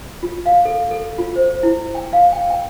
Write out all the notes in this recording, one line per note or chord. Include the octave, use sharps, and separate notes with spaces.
F4
F5
A4
A4
F4
C5
E4
G5
F5
G5
G5